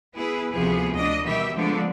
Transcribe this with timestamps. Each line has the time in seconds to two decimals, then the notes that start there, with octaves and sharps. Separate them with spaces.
0.15 B3 E4 G#4 B4
0.51 D2 C3 F3 B3 G#4
0.94 D2 D4 D#5
1.24 B2 D#3 G3 G4 E5
1.55 D3 F3 G#3 A3 B3 D4